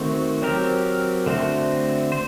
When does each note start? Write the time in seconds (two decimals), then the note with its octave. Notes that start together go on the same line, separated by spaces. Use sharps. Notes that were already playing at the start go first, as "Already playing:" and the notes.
Already playing: D#3 A3 C4 F#4
0.42 F#3 C4 G4 A#4
1.26 D3 A3 C4 F#4 C5
2.12 C5